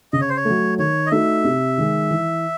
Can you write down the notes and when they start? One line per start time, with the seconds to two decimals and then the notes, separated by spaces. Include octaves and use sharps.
0.13 C#3 D#5
0.21 C#5
0.29 C5
0.37 C#5
0.45 F#3 A3
0.78 D#3 C#5
1.06 D#5
1.11 A3 D#4 F#4 E5
1.44 C3
1.78 D#3 G#3
2.11 E3